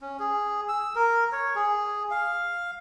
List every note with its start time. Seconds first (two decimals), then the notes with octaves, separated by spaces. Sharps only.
0.01 C#4
0.19 G#4
0.69 E6
0.95 A#4
1.32 C#5
1.55 G#4
2.11 F5